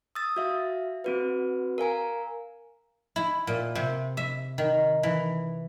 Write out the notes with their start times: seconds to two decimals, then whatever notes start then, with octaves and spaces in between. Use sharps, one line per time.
0.15 D#6 E6 A6
0.36 F#4 E5 F5
1.04 C4 F#4 B4
1.78 A#4 F5 G#5 A#5
3.16 E4
3.47 A#2
3.75 C3
4.17 E5
4.58 D#3
5.03 E3